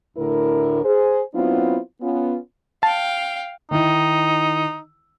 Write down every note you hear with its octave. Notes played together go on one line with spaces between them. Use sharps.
D2 A2 D3 E4 A#4
G#4 C5
F#3 B3 C4 D4 E4 F4
B3 C#4 F4
F5 G5 A5
D#3 D#4 E4